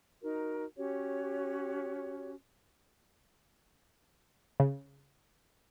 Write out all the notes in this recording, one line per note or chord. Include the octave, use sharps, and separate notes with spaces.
D#4 F#4 A#4
C#4 F#4 G4 C#5
C#3